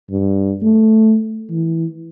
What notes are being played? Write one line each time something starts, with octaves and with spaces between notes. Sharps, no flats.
G2
A3
E3